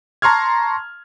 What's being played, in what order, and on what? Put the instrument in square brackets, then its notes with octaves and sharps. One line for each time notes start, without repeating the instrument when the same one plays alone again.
[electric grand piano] A5 A#5 C6 C#6 F6 G#6